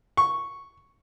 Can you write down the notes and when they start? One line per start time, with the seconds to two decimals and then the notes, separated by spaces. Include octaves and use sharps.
0.17 C#6